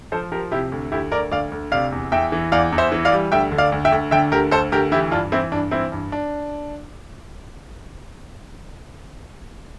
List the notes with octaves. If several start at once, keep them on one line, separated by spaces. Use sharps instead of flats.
F3 A4 C5
F3 G4 A#4
C3 E4 G4
D2
D2 E4 G4
D2 A#4 D5
D2 D5 F5
D2
C3 D5 F5
E2
E2 E5 G5
E3
E2 D5 F5
E2
C5 E5
E3
D5 F5
G3
D2 E5 G5
D3
D5 F5
D2
E5 G5
D2
D3 E5 G5
D2 G4 A#4
D2 A4 C5
D2 G4 A#4
E3 E4 G4
G2 D4 F4
E3 C4 E4
G2 D4
E3 C4 E4
G2
D4